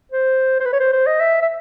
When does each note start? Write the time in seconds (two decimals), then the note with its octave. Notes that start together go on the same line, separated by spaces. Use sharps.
0.12 C5
0.60 C5
0.65 B4
0.73 C#5
0.80 C5
0.92 C5
1.07 D#5
1.20 E5
1.42 E5